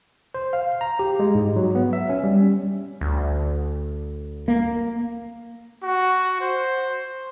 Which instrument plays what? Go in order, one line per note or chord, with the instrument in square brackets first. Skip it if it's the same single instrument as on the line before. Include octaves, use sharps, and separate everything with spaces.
[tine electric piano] C5
F5
A#5
G4
G#3
G#2
F#3
B3
E5
C#4
G3
C#4
[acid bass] D2
[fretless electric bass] A#3
[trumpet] F#4
C5